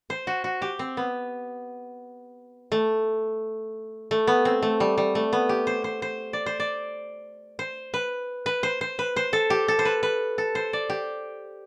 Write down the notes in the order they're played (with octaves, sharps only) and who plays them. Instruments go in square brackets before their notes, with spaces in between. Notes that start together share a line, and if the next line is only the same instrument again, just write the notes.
[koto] C5
F#4
F#4
G4
C4
B3
A3
A3
B3
C4
A3
G3
G3
A3
B3
G4
C5
C5
C5
D5
C5
D5
C5
B4
B4
C5
C5
B4
C5
A4
G4
A4
C5
B4
B4
A4
C5
D5
G4